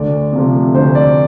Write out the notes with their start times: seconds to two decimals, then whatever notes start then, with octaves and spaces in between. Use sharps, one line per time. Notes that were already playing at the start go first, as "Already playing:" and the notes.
Already playing: D2 D5
0.33 C3 F3 A3
0.74 D2 C5
0.95 D5